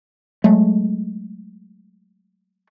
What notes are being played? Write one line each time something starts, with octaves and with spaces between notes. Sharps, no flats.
F#3 G#3 A3